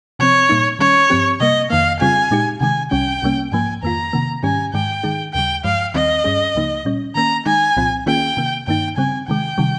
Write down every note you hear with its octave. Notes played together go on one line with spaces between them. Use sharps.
C3 F3 C4 C#5
A#2 G3 A#3 D#4
D#3 G3 C#4 C#5
G2 F3 C4 G4
C3 G3 A#3 D#5
F2 D#3 A#3 F5
C#3 G3 C4 F4 G#4 G#5
A#2 G#3 D#4 G4
C3 D#3 G#3 G#5
C2 C3 G3 C#4 G5
C2 C3 G3 A#3 C#4
G#2 F3 A#3 G#5
F2 D#3 A#3 F4 A#5
C3 D#3 A#3
G#2 D#3 G3 C#4 G4 G#5
G#2 D#3 G#3 G5
D#3 G#3 D#4 G#4
D#2 C#3 G3 G5
G2 F3 G#3 F5
D#2 D#3 G3 C4 D#5
G2 G3 C#4 G#4
C#2 C#3 F3 A#3 D#4
A#2 G3 C#4
D#3 A#3 C#4 A#5
D#3 G#3 D#4 G#5
C2 A#2 F3 C4 F4
D#3 A#3 C#4 F4 G#4 G5
C3 D#3 A#3
G2 D#3 A#3 D#4 G5
C#3 G3 C4 G#5
C3 D#3 G#3 G5
C3 D#3 G3